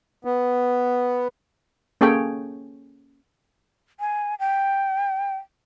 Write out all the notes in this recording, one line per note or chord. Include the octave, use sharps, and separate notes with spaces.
B3
A#3 C#4 G#4 A4 C#5 G5
G#5
G5